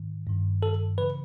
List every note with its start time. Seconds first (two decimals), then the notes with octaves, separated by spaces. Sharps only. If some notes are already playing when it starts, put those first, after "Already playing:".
Already playing: G#2 D#3
0.27 G2 D#3
0.63 A4
0.98 C#3 E3 B4